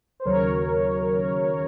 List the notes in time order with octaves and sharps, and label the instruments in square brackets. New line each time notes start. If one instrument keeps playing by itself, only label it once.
[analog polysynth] C5
D#2 C#3 F#3 A#4 C#5